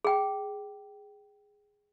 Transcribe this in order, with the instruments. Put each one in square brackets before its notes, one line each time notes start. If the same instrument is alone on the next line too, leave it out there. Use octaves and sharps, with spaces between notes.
[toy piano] G#4 G5